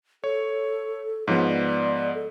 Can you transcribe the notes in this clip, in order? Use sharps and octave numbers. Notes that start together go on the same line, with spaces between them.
A4 C#5
G#2 F3 B3 C#5
D5
A4